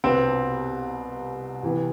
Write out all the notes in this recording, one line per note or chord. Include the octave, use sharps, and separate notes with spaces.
C2 B2 B3 C4 F4 B4
C3 E3 B3